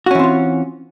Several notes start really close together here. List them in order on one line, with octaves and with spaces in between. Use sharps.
F#4 C#4 E3 C4 F4